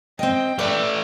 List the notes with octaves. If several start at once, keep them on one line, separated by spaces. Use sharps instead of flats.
C4 D#5 G5
A3 B4 D5